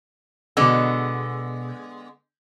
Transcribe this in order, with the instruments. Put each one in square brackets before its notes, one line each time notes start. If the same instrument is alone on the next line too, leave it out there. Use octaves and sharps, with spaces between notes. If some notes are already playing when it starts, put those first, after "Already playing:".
[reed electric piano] B2 E6 [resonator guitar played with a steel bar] D3 G#3 B3